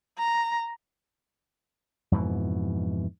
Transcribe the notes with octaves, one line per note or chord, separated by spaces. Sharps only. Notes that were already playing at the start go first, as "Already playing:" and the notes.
A#5
F2 G#2 B2 E3